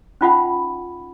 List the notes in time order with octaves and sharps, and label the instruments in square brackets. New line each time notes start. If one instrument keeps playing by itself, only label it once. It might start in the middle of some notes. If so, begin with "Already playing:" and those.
[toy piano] C#4 D#4 F4 E5 F#5 B5